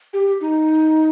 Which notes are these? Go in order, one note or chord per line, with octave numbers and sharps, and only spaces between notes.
G4
D#4